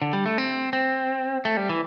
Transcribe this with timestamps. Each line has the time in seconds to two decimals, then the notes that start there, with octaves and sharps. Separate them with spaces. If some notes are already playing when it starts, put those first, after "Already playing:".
0.02 D3
0.13 G3
0.26 A3
0.38 C4
0.73 C4
1.45 A3
1.57 G3
1.69 E3